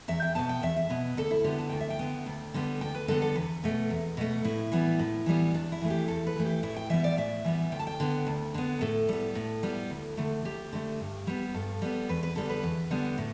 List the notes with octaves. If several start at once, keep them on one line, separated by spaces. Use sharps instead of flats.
E2 E5
G5
B2 B3 A5
G5
E2 E5
E5
B2 B3
D2 A4
E4
D3 B3 G4
A5
D2 G5
E5
G5
D3 B3
D2
D3 G3 B3
D2 G5
B4
D3 G3 B3 A4
A4
E2 B4
B2 A3
E2
B2 A3
A2 E4
E3 G3 B3
A2
E3 G3 B3
E2 D4
E4
E3 A3
G4
E2 A4
B4
E3 A3
G4
A2 E4
G5
E3 G3 B3 E5
D5
A2 E5
E3 G3 B3
D2 G5
A5
G5
D3 B3
D2
D3 B3
A2 A4
G3 B3
A2
G3 B3
D2
D3 A3
D2 G4
D3 A3
G2
G3 B3
G2 A4
G3 B3
E2 B4
B4
D3 G3 B3 A4
B4
E2
D3 G3 B3
A2